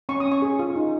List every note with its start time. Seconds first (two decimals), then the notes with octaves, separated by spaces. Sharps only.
0.09 C#4 C#6
0.20 D#6
0.25 C#4
0.32 C#6
0.42 G#4
0.59 F4
0.76 D#4